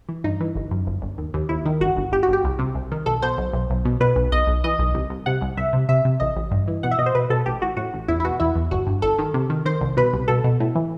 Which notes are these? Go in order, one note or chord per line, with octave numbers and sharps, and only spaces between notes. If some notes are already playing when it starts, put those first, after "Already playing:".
E3
G2 D#4
E3
G1
F#2
G1
G1
D#2
D#2
D#2 E4
D#3
G1 F#4
G1
G1 G4
F#4
G1 G4
C2
C3
C2
D#3
B1 A4
B2 C5
B1
B1
B1
B2
B2 B4
B1
B1 D#5
B1
E3 D#5
B1
C2
C2
C3 F#5
C2
C2 E5
C3
C3 E5
C3
A1 D#5
A1
G2
E3
B2 F#5
E5
B2 D#5
C5
B2 B4
B2 A4
A1 G4
A1 F#4
A2 F#4
A1
E2 E4
E4
B2 F#4
E2 E4
E2
G1 F#4
G2
G1 A4
D#3
C3
D#3
D#3 C5
C2
B2 B4
C2
B2 A4
B2
A2
E3